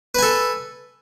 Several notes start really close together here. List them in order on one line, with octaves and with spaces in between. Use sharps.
B4 G#5 A4